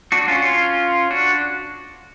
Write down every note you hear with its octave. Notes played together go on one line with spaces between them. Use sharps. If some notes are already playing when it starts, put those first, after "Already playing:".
D4 F#4
C#4 F4
C#4 F4
D4 F#4